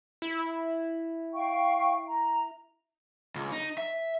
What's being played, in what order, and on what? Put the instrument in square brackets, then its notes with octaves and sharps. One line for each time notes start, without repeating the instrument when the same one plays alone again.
[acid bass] E4
[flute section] F5 G5 C#6
A#5
[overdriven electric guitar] C#2
D#4
E5